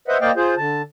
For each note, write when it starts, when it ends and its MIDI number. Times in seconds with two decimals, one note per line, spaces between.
0.08 0.17 71
0.08 0.17 72
0.08 0.17 75
0.08 0.17 76
0.08 0.17 78
0.21 0.31 58
0.21 0.31 72
0.21 0.31 74
0.21 0.31 75
0.21 0.31 77
0.21 0.31 79
0.36 0.55 65
0.36 0.55 68
0.36 0.55 72
0.57 0.82 50
0.57 0.82 81